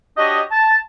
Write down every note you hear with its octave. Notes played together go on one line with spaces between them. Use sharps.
D4 F#4 G4 C#5 D#5
A5